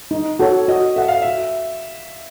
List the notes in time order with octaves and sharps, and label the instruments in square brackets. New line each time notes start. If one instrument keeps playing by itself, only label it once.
[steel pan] D#4
F#4 A4 C#5
[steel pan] F#4 [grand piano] D#5
[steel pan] A4 C#5 F#5 [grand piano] E5
[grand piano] F5
[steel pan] F#4 [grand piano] E5